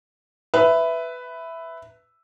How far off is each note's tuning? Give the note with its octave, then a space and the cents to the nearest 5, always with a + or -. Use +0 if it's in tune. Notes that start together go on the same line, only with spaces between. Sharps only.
B4 +10 E5 +0